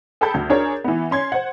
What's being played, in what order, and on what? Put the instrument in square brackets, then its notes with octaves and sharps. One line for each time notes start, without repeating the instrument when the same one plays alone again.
[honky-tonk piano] G#4 A4 G5 A5 B5 G6
D2
D4 G#4 A#4 C#5
E3 B3
C#4 C6 G#6
C5 F#5